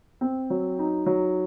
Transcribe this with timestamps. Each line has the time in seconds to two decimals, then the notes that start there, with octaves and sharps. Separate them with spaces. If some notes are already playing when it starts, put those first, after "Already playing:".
0.21 C4
0.50 F#3
0.79 D#4
1.06 F#3